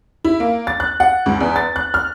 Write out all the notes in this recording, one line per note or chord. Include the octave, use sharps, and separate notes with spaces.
E4
A#3
A6
F#6
F#5
C#2
E2
A6
F#6
F6